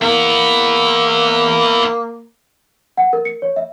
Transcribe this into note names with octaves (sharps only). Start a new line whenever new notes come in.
A#3 B3 E4
F#5
A#4
C#7
C#5
E5